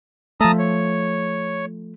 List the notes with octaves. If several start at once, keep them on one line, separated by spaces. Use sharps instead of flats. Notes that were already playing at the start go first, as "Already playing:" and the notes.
F3 A3 A5 A#5 D#6
C#5